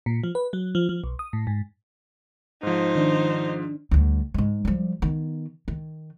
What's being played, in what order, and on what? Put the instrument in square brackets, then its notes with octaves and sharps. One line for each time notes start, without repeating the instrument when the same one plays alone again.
[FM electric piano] A#2
F3
B4
F#3
F3
F3
B1
D#6
A2
G#2
[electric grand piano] G#2 F3 [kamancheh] D#4 C5
[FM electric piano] D#3 D4
[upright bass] D2 G3
G#2 G#3
F3 G3
D#3 B3
D#3